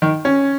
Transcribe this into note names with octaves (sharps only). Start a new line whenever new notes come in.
D#3
C#4